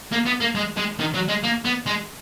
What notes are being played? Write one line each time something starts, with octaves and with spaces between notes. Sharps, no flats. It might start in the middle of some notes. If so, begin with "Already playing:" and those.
A#3
B3
A#3
G#3
G#3
D#3
F#3
G#3
A#3
B3
G#3